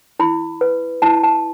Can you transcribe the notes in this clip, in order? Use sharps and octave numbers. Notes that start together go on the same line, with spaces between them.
E4 B5
B4
E4 A5
A5